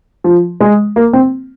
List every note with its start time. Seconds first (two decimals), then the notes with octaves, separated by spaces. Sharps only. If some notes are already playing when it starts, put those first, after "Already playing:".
0.24 F3
0.61 G#3
0.96 A#3
1.13 C4